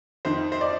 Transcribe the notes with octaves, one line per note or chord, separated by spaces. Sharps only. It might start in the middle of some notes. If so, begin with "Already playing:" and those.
F2 D#3 C5
C5
D5